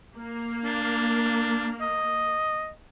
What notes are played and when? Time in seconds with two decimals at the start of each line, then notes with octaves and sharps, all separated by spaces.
0.16 A#3
0.65 D4
1.81 D#5